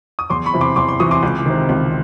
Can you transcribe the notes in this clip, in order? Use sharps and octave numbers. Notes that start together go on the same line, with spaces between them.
D#6
E2 C6 D6
B5 C#6
C3 E3
C6 D6
E2 C6 D6
C6 D6
C3 E3 C#6 D#6
C6 D6
C#2
C3 D#3
C#2